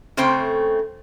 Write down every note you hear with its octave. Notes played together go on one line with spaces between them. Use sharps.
C#3 A3 C4 C5 G5